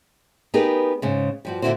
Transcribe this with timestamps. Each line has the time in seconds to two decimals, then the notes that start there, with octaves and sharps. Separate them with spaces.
0.54 B3 D#4 G4 G#4 A#4 B4
1.02 G#2 C#3
1.45 G2 F3 F#4
1.62 A#2 D3 D4 E4 F#4 C5